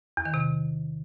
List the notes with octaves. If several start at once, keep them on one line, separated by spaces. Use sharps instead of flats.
E2
D#3
C3